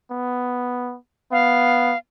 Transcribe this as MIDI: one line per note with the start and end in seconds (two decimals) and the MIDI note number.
0.11 0.97 59
1.32 1.94 59
1.32 1.98 77